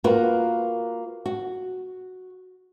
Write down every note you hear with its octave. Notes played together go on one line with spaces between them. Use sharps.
A#3 F4 F#4 A#4 B4
F#4